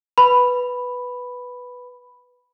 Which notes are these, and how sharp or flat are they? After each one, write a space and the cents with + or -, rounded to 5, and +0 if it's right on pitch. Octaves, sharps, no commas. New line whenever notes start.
B4 +0 B5 +0